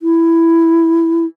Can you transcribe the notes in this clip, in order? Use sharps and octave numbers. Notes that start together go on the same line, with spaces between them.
E4